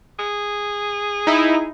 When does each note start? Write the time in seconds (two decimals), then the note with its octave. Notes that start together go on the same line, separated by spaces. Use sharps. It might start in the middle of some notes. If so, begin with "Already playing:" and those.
0.19 G#4
1.27 D#4 E4